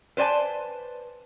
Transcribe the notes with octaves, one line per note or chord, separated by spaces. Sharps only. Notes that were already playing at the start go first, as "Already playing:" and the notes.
B4 C5 D5 G#5 A5